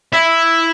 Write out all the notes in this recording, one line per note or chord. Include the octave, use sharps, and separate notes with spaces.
E4